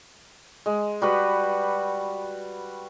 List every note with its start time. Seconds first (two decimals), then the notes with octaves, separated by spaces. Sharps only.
0.66 G#3
1.02 G3 F#4 B4